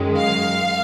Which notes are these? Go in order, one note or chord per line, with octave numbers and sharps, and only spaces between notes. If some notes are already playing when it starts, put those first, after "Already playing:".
Already playing: F#2 D#3 G#3
F5